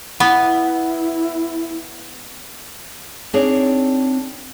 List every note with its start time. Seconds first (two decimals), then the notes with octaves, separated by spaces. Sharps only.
0.20 B3 E4
3.34 C4 D4 D#4 G#4 C#5 D5